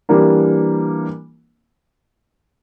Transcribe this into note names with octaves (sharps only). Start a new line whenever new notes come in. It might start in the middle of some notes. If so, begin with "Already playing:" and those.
E3 G3 A#3 D4